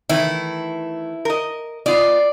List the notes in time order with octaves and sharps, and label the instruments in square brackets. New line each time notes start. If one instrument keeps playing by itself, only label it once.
[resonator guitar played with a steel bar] D#3 E3 A3 [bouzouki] E4
[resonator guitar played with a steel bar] A#4 D#5
[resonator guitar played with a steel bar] B3 F4 D#5 [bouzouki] D5